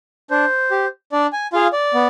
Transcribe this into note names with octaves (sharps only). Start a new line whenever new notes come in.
D4 C5
G4
D4 D5
G#5
F4 G#4 F5
D5
B3